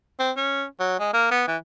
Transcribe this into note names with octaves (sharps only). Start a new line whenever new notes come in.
C4
C#4
F#3
G#3
A#3
B3
E3